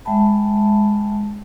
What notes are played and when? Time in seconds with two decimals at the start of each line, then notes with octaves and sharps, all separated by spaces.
0.05 G#3 E5 G5 A5 B5